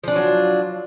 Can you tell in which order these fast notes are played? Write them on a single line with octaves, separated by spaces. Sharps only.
F3 D4 F4 F#3